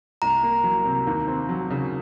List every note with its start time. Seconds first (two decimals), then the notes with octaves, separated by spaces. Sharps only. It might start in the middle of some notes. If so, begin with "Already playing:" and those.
0.22 C2 A#5
0.43 A#3
0.64 F#3
0.85 C3
1.07 D#2
1.27 C4
1.49 F#3
1.70 C#3